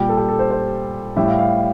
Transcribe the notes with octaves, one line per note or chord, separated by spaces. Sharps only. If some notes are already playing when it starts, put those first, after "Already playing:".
Already playing: A#2 G3 G4
A4
G4
A4
C5
C5
A2 G3 E5
F5
F5